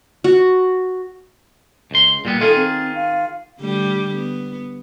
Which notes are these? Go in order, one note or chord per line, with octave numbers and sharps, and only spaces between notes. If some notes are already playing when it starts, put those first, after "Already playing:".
F#4
C#2 C6
A#2 G3 B3
D#3 F4 G#4 A4
C4
F5
D3 G3 A3
B3